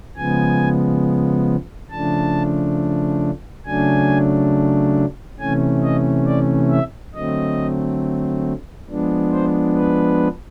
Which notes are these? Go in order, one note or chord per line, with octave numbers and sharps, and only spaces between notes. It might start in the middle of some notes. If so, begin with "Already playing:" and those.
C#3 F3 G#3 B3 G#5
C#3 F3 A3 D4 A5
C#3 F#3 A3 D4 G#5
C3 E3 A3 C#4 G#5
D#5
D5
E5
D3 F#3 A3 C4 D#5
F3 G#3 B3 D4
C5
B4